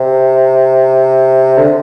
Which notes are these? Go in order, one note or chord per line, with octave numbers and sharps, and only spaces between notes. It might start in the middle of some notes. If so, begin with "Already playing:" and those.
Already playing: C3
D3